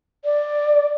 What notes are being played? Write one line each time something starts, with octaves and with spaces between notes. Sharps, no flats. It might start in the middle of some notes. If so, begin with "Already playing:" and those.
D5